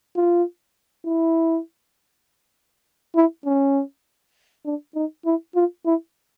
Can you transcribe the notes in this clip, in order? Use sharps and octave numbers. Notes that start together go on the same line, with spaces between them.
F4
E4
E4
C#4
D4
D#4
E4
F4
E4